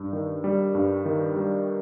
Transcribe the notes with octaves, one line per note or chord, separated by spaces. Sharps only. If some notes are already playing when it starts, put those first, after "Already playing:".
Already playing: G2
D#3
G3
G2
D#3
G3